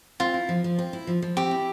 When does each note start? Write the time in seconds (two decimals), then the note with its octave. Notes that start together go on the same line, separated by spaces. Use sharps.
0.20 C4 F4
0.34 E4
0.49 F3
0.64 F3
0.79 C4
0.93 E4
1.07 F3
1.22 F3
1.37 C4 G4
1.51 E4